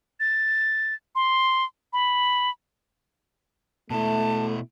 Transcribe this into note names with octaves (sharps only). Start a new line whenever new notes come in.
A6
C6
B5
B2 A3 E4 A5